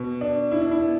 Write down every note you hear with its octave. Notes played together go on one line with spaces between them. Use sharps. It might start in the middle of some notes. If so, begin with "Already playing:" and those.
Already playing: B2
D4
E4
D4
E4
B3